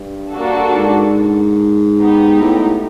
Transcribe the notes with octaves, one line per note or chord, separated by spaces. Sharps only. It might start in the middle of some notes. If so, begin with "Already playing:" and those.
Already playing: G2
A#3 D4 F#4 A4
G#2
B3 D#4 G4
A2